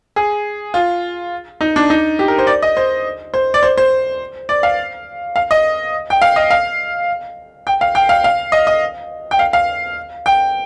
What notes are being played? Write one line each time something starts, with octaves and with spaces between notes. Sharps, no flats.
G#4
F4
D#4
D4
D#4
G4
A#4
C5
D5
D#5
C5
C5
D5
C5
C5
D5
F5
F5
D#5
G5
F5
D#5
F5
G5
F5
G5
F5
F5
D#5
D#5
G5
F5
F5
G5